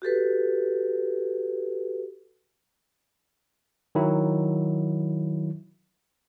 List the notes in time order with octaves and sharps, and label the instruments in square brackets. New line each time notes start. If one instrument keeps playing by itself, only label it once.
[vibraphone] F#4 G4 A4 B4
[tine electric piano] D#3 F#3 E4